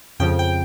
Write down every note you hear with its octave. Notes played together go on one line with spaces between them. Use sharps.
F2 C#3 F3 G5
G5